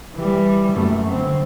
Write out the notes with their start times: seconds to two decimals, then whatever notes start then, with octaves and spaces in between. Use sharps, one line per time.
0.15 E3 G3
0.70 F#2 A3
1.09 D3 C4